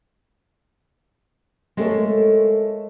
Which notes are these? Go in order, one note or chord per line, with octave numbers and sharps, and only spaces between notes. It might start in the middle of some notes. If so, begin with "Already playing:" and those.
G#3 A3 A4 A#4 C#5